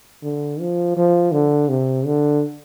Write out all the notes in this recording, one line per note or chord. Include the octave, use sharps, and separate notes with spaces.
D3
F3
F3
D3
C3
D3